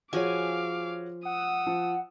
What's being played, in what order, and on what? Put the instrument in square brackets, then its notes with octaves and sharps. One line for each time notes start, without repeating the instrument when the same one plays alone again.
[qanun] F3 G#5 [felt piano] F#4 G#4 C#5 [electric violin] F5 D6
[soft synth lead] F#5 [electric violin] D#6 E6
[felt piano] F3